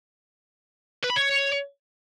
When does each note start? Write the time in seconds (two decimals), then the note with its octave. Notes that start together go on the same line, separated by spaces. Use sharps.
1.04 B4
1.10 B5
1.16 C#5